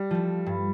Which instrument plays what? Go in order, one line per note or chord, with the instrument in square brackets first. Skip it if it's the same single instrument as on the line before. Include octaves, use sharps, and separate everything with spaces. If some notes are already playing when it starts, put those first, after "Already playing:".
Already playing: [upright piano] G3
[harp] F3 A3
G2